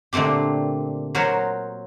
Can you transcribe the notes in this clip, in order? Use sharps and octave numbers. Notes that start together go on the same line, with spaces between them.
A#2 D3 A3 C4 G4
F#3 F#4 A#4 C5 C#5